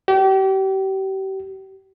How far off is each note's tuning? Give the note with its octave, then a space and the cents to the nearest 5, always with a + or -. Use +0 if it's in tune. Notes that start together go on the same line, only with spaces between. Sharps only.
G4 -35